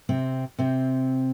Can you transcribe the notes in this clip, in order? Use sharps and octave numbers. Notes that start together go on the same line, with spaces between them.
C3 C4
C3 C4